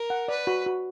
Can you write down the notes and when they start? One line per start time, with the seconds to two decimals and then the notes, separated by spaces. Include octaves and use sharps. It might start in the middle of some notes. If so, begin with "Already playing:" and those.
Already playing: A#4
0.10 F#5
0.28 B4 D5
0.47 F#4
0.66 F#4